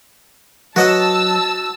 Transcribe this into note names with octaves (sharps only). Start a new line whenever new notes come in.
F#3 F#4 B4 C#5 D#5 F#5 A5 E6